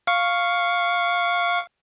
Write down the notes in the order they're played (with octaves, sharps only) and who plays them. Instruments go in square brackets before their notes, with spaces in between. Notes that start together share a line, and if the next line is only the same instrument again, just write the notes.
[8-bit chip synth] F5 C#6